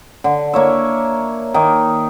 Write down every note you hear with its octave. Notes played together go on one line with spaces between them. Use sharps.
D3
A#3 C#5 E5
D#3 A#3 D#4